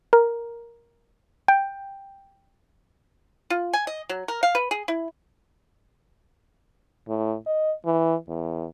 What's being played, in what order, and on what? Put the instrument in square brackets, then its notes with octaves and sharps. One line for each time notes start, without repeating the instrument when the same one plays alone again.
[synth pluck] A#4
G5
[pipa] F4
G#5
D#5
F#3
A#4
F5
B4
G#4
E4
[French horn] A2
D#5
E3
E2